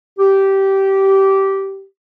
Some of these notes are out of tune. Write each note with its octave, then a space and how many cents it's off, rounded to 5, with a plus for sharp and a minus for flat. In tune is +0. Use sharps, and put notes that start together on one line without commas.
G4 -15